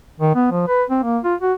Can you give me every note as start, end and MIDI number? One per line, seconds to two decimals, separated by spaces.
0.20 0.34 51
0.35 0.51 59
0.51 0.67 53
0.68 0.83 71
0.90 1.01 60
1.03 1.19 58
1.24 1.35 65
1.41 1.53 66